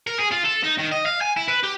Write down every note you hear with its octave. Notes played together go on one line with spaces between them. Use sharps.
A#4
G#4
F4
A4
D#4
D#3
D#5
F5
G#5
E4
B4
G4